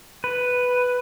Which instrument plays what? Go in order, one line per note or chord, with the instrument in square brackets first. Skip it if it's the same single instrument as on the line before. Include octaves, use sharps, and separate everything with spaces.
[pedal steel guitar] B4